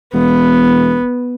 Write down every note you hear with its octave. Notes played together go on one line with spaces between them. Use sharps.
E1 B3